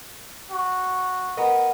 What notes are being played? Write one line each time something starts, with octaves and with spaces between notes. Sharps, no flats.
F#4
B3 A#4 D#5